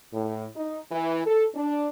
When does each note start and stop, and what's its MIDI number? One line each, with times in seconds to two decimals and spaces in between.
0.13 0.45 45
0.55 0.80 63
0.91 1.21 52
1.26 1.46 69
1.55 1.89 62